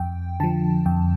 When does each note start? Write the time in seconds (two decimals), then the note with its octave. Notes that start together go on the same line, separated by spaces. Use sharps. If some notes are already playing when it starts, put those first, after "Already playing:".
Already playing: F2 G5
0.40 D3 F3 A5
0.86 F2 G5